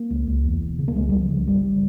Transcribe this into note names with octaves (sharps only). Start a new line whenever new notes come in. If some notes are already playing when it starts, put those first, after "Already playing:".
Already playing: A#3
C#2
C#2
E2
E1
C#3
A#3
C#2 G#3
C#2 G3
F3
C#2
G1 G3